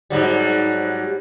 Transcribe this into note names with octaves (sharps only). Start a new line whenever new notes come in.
G#2 F#3 G3